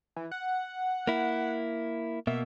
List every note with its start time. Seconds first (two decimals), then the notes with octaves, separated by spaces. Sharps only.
0.16 E3
0.32 F#5
1.07 A#3 E4
2.27 B2 A#3 E5